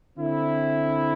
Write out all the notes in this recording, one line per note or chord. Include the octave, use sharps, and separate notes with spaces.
D3 C4 E4